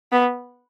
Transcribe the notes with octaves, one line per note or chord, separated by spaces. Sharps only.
B3